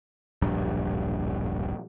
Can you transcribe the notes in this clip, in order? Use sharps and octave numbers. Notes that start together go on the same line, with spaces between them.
D1 A#1 G2